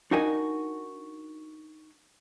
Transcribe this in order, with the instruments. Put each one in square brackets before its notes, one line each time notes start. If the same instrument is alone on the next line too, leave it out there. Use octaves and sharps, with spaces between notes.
[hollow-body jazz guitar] D4 D#4 F#4 A#4 G#5